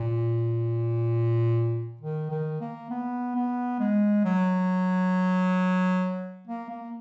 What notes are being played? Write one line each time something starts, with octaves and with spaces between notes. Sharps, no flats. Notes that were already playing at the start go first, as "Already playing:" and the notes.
Already playing: A#2
D#3
D#3
A#3
B3
B3
G#3
F#3
A#3
A#3